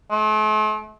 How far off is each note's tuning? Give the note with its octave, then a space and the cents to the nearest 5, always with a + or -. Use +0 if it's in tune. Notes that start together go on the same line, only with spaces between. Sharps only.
A3 -45